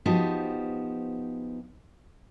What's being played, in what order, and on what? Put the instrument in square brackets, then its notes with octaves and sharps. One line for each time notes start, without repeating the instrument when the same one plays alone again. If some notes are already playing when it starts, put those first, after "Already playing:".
[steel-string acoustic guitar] F3 B3 D#4 F#4 G4 C5